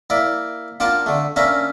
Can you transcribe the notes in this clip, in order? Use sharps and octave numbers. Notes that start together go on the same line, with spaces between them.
A#3 E4 D5
A#3 D4 F4 D5 F#5 A5
D3 A3
A#3 C#4 D4 E5 A#5